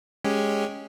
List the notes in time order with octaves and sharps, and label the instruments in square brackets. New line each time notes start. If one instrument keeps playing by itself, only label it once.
[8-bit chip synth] G#3 C#4 G4